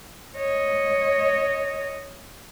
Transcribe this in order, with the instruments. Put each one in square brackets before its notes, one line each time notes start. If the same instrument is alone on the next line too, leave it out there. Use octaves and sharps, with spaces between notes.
[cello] C#5 D#5